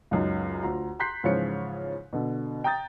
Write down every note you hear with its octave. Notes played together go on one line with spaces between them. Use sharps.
C#2 F#2 D#4
D2 F4 A#5
A#5 C6 F#6 G6 B6 C7
G#2 C#3 E3 F3 C#5 C#7
B2 D3
G5 A#5 D#6 G6 A6